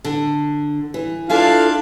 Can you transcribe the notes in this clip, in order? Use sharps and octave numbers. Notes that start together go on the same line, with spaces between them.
D3
E3
D4 E4 F4 A4 F5 A5